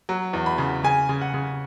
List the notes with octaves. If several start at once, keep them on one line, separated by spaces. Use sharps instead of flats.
F#3
E2
B5
C#3
C#3 G#5
C#3
F#5
C#3